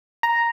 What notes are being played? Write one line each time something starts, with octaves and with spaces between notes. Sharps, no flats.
A#5